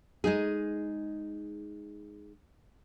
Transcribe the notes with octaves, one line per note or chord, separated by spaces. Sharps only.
G#3 D#4 G#4